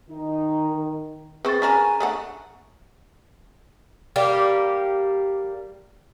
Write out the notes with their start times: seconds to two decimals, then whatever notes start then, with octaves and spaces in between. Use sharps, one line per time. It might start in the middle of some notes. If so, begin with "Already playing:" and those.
0.10 D#3 D#4
1.45 C4 G#4 B4 C5 C#6 A6
1.62 C#4 D4 A#4 G#5 A#5
2.00 A3 D4 F#5
4.16 G3 A#3 G4